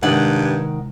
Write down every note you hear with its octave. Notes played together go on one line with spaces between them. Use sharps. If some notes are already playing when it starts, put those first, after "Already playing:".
G2 C3 D#3 G#3 F#5